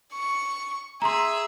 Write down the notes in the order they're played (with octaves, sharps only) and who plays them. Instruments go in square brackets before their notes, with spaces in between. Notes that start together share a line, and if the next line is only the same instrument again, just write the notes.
[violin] C#6
[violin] G#4 E5 [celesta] A#5 C6